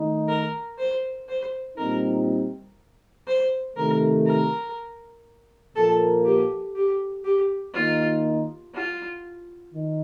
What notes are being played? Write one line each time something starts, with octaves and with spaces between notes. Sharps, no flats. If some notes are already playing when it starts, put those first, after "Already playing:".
Already playing: D#3 A3 D#4
A#4
C5
C5
A#2 G3 C4 D#4 A#4
C5
C3 D#3 A3 A#4
A#4
A#2 F3 A#3 A4
G4
G4
G4
D#3 A#3 D#4 F4
F4
D#3